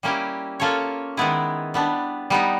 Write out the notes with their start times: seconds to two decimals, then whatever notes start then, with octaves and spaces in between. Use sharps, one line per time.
0.03 G3 A#3 C#4 E4 G4
0.60 A#3 C#4 F4 A4 C#5
1.17 D#3 G#3 B3 E4 G#4
1.74 G3 B3 D4
2.30 G3 B3 D#4